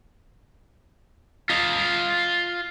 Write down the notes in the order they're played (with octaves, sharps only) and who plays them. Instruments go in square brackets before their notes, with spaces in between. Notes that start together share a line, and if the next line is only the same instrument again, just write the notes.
[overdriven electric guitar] F4 D#5